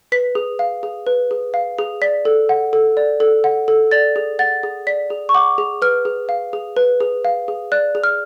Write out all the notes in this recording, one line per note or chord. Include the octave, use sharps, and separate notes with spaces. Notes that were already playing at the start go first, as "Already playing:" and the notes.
B4 B6
G#4
F5
G#4
B4
G#4
F5
G#4
D5 B6
A4
F#5
A4
D5
A4
F#5
A4
D5 A6
G#4
F#5 A6
G#4
D5 B6
G#4
C#6
F#5 D6
G#4
B4 F6
G#4
F5
G#4
B4
G#4
F5
G#4
D5 F#6
G#4
F6